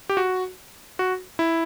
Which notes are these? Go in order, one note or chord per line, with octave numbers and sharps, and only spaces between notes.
G4
F#4
F#4
E4